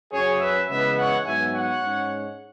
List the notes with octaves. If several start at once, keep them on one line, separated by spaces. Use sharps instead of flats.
F#2 F#3 C#4 G#4 C#5
B4 E5
C#3 E3 G#3 B3 B4 E5
C#5 F#5
G#2 F#3 B3 E5 G#5
C#5 F#5
G#2 G#3 C#4